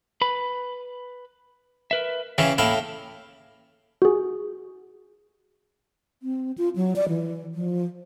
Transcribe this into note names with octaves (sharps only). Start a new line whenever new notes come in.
B4 B5
A#4 B4 E5
C#3 E3 C#4 E5 F5 G5
A2 A#3 E4 F5 G5
F#4 G#4
C4
F4
F#3
D5
E3
F3